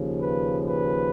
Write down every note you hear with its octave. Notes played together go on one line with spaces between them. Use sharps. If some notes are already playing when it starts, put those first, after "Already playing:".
Already playing: D#2 C#3 F3
B4
B4